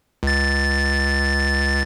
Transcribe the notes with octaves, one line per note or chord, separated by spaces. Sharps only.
C#2 A6